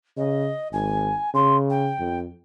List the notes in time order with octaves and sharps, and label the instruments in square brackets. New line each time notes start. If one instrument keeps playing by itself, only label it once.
[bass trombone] C#3 [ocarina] D#5
[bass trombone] G#1 [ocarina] G#5
[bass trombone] C#3 [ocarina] C6
[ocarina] G5
[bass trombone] F2